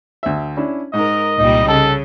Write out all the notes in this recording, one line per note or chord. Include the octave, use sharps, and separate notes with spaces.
D2 E5
C#4 D4 E4
G#2 A#4 D#5
C2 A#2 G3 D#4
C#3 A4